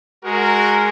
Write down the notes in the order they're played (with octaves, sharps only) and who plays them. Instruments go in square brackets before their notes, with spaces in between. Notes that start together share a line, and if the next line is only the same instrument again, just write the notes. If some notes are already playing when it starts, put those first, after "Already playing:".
[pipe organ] G#3 [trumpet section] F#4 A#4